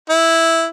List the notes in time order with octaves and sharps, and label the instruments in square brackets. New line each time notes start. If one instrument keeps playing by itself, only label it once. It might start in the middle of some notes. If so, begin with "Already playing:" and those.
[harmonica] E4